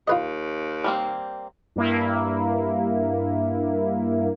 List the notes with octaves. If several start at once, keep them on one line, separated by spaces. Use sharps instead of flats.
D#2 F4 B4 D#5
G3 A#3 C4
G2 A#3 E4